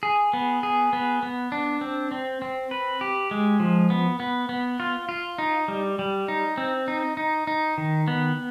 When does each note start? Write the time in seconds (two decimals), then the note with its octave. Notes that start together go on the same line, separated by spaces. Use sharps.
0.03 G#4
0.33 B3
0.63 G#4
0.93 B3
1.23 B3
1.52 D4
1.81 C4
2.11 C4
2.42 C4
2.71 B4
3.01 G4
3.31 G#3
3.60 F3
3.90 B3
4.20 B3
4.49 B3
4.80 F4
5.09 F4
5.38 D#4
5.68 G3
5.99 G3
6.28 D#4
6.58 C4
6.88 D#4
7.17 D#4
7.47 D#4
7.78 D#3
8.08 B3